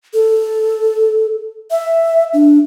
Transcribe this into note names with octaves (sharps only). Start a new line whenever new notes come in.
A4
E5
D4